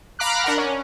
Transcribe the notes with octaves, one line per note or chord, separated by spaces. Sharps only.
F5 A#5 B5 D6 F6 F#6
D4 A#4 F#5
C#4